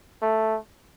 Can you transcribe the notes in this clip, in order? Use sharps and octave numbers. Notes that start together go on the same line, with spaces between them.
A3